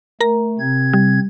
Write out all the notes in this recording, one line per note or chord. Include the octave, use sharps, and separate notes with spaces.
A3 A#4 A#5
C3 C4 G#6
G3